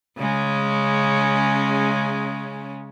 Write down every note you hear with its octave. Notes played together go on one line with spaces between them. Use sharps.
C#3 G#3 C#4